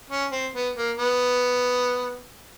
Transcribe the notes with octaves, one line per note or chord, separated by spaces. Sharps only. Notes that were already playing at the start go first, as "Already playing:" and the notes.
C#4
C4
B3
A#3
B3